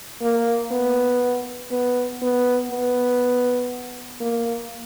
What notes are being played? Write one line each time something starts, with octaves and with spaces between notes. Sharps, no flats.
A#3
B3
B3
B3
B3
A#3